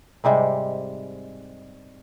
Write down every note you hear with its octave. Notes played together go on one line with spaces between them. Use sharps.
G#2 C3 G3 G#3